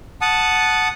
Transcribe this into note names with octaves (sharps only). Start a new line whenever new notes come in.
F#5 A5 D#6